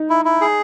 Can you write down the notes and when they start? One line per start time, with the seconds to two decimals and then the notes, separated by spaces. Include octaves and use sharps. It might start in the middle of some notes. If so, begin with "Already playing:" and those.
Already playing: D#4
0.10 E4
0.25 E4
0.41 G#4